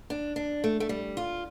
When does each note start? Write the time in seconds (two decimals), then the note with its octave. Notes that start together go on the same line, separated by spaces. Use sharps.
0.10 D4
0.36 D4
0.64 A3
0.80 A3
0.89 G3
1.17 F4